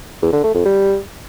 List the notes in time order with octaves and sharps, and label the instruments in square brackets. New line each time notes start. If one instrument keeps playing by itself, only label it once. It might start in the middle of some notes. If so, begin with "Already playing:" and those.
[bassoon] E2
D3
A3
F2
G3